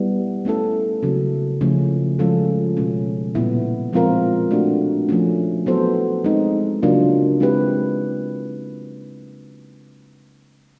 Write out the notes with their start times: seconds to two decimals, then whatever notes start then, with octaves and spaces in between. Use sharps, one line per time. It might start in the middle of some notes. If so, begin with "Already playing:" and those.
Already playing: G3 B3 E4
0.45 A3 C#4 E4 A4
1.03 C#3 F#3 A#3
1.61 C#3 F3 A3 C#4 E4
2.19 F3 G#3 C#4 F4 A4
2.77 B2 G#3 C#4
3.35 A#2 G3 B3 E4
3.93 F3 G#3 C4 F4 A#4
4.51 A3 D4 F#4 A#4
5.09 F3 A3 C#4
5.66 F#3 B3 E4 A4 C5
6.24 G#3 C4 D#4
6.83 C#3 F#3 A#3 D4 F4
7.40 G#3 C4 E4 G4 B4